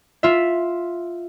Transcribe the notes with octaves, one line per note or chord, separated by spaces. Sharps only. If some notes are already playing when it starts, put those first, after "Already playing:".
F4 E5